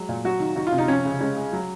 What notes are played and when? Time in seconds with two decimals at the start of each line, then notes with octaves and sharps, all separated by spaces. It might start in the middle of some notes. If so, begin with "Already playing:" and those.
Already playing: F#3 G#3
0.09 A#2
0.24 F#3 F#4
0.40 D#3
0.56 D#3 F#4
0.67 F4
0.72 C3
0.78 D#4
0.88 F3 C#4
1.05 C#3
1.20 G#3 C#4
1.37 G#3
1.53 F#3